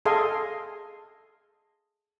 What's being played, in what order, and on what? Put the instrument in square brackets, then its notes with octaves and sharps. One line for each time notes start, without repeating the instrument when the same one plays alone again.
[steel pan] G#4 A4 D#5 F5 G#5 C6